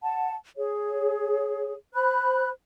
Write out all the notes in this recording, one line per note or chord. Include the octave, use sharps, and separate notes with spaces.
F#5 A5
G#4 C#5
C5 B5 F#6